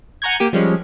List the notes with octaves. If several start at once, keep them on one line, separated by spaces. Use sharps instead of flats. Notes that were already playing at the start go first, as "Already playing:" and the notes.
F#5 G#5 A#5 C#6 G6 G#6
A#3 G4 D#7
F3 G3 G#3 C#4